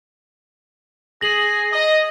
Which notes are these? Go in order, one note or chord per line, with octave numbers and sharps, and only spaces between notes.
G#4 A#6 F#7
D#5